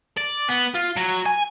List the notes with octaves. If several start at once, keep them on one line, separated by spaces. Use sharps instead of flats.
D5
B3
F4
F#3
G#5